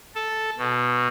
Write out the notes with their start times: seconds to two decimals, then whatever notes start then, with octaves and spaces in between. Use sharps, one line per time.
0.15 A4
0.58 B2